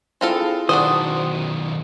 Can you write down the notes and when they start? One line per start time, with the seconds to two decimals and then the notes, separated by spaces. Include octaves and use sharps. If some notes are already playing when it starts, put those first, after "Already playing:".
0.21 C4 E4 F4 G#4 A4
0.69 B1 D#3 D4 F#4 C5 D#6